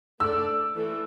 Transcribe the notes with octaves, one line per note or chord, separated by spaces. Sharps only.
A3 D4 A4 D5 E6
E3 A3